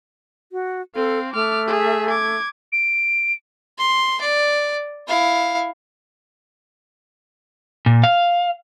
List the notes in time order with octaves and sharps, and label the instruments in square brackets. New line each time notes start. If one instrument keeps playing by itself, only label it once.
[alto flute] F#4
[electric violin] C4 F5 [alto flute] A4
[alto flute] A3 [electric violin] D6 F6
[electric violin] G#4 E5
D6 G#6
[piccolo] D7
[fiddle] C6
D5
E4 F5
[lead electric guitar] A#2
F5